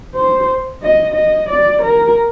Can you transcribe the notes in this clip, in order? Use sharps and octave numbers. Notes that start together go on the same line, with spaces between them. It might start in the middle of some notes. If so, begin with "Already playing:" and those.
C5
D#5
D#5
D5
A#4